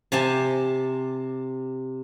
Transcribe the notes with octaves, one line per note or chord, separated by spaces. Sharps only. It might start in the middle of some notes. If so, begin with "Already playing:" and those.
C3 G4 G#5 A5